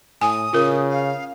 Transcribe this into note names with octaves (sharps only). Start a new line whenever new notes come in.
A2 G#5 D#6
C#3 F4 A#4
F5